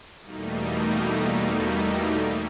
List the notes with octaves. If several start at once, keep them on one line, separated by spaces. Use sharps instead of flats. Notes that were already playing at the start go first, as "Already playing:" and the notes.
E2 B2 G3 A3 A#3 D#4